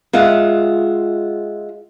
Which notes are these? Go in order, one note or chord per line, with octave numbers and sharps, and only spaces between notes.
G#3 F4 E5 F#5